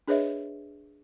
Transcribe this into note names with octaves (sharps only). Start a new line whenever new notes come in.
D4 G#4 B4 C#5 D#5 E5